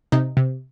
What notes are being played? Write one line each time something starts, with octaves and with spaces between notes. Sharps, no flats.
C3 D#4
C3